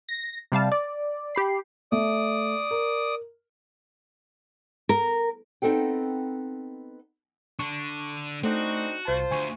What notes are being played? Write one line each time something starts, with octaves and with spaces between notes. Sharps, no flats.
A#6
C3 G3 F5 A5
D5
G4 B5 C7
A3 D5 D#6
A#4
A#4
B3 C4 D#4 A4 G5
D3 D4 C#6
A3 C4 D4 D#4 F#4
C2 F4 C5 A5
D2 G#5 C#6